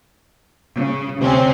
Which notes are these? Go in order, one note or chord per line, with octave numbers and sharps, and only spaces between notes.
C#3
D2 C3 C4 C#4